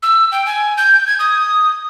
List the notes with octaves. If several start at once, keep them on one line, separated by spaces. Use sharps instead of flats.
E6
G5
G#5
G6
G#6
D#6